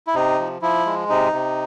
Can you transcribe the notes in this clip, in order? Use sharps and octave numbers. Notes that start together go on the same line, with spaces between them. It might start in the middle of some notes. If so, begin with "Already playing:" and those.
E4
C3 D#4
F3
F3 E4
G#3
C3 D#4
C3